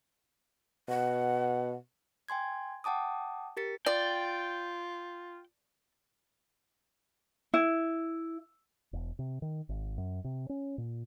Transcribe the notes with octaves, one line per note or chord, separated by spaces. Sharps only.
B2 F#5
G5 G#5 C6 G#6
F#5 G5 A5 D6 D#6
G4 A#4 A6 B6 C#7
F4 D5 G5
E4
E1
C3
D#3
G#1
F#2
C3
C#4
A#2